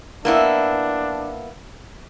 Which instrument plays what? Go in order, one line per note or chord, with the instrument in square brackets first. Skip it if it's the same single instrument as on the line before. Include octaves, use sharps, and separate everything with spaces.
[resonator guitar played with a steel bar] A#3 B3 E4 [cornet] D4